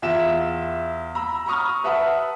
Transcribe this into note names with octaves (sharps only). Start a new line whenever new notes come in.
E2 F4 E5 E7
A#5 B5 E6
A#5 B5 C#6 D#6 F6
B4 E5 F#5 A5